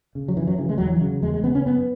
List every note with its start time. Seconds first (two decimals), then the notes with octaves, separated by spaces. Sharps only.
0.15 C#3
0.28 F#3
0.36 F#2 E3
0.47 F#3
0.58 C#3 E3
0.69 G#3
0.78 E2 F#3
0.87 E3
0.96 C#3 F#3
1.22 E2 G#3
1.34 G#3
1.43 C#3 B3
1.55 C#4
1.66 F#2 B3